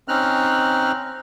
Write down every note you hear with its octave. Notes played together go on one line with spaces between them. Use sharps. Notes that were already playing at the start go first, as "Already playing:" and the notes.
C4 C#4 D#4 F6 F#6